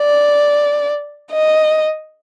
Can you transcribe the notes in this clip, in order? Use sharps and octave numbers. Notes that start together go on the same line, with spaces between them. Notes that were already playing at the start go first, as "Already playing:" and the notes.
Already playing: D5
D#5